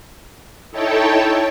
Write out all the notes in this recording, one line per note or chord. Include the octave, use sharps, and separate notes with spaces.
D#4 E4 A4 C#5 G5 A5